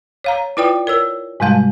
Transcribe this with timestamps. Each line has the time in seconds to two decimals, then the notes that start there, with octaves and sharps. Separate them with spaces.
0.24 C#5 F5 A#5
0.57 E4 F4 B4 D5 G5 D#6
0.87 A#4 C#5 E6
1.40 G#2 C3 G3 G#3 F5 A5